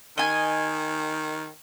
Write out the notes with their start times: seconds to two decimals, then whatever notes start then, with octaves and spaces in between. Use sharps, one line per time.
0.18 D#3 D#5 G#5